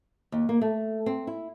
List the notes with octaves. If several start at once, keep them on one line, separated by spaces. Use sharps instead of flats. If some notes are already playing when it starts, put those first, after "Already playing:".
D#2
A#3
A3
C4
E4